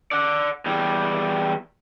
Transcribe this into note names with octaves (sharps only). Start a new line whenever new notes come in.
D5 F#5
E2 G3